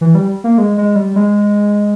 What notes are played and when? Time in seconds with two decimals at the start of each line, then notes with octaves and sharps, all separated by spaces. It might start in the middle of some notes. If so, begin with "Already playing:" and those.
0.01 E3
0.15 G3
0.44 A#3
0.58 G#3
0.78 G#3
0.96 G3
1.16 G#3